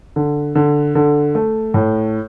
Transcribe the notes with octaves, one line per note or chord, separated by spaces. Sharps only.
D3
D3
D3
A3
A2